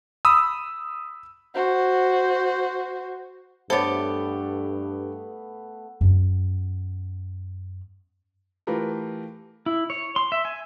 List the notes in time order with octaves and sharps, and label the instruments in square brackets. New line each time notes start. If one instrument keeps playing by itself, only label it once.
[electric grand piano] B5 D#6 E6
[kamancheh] F#4 C5
[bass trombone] G2 [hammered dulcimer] A3 B3 [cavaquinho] G4 A4 [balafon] C5 C#5
[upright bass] F#2 B3
[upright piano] E3 A3 F4 G4 A#4 B4
[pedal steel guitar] E4
C#5
C6
E5
G#5